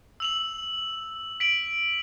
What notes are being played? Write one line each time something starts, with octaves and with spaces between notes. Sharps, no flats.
E6 F7 F#7
B6 D7 F#7